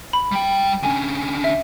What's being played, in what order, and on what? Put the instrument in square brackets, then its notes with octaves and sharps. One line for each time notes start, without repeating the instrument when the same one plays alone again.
[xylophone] B5
[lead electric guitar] G3 G5
[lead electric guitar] D3 C#4 [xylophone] G#5
[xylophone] E5